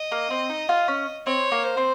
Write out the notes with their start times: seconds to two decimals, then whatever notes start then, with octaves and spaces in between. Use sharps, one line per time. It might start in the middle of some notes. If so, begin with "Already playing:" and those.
Already playing: D#5
0.12 A#3
0.30 C4
0.50 D#4
0.69 F4
0.88 C#4
1.27 C4 C#5
1.52 A#3
1.64 C5
1.77 C4